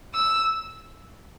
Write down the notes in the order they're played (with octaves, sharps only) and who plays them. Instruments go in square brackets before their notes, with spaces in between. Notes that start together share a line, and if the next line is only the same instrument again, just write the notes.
[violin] E6